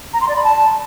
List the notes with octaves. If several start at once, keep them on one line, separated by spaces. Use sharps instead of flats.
A#5
C6
D5
B5
A5